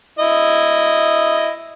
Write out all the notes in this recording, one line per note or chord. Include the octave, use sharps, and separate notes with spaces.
E4 D#5